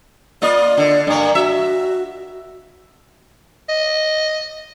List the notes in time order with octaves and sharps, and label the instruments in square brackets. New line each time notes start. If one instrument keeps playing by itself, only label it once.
[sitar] A#3 F4 D#5 [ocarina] D5
[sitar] D3
G2 A#3
[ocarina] F#4 [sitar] E5
[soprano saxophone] D#5